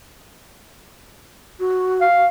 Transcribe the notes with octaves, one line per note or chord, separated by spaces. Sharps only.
F#4
F5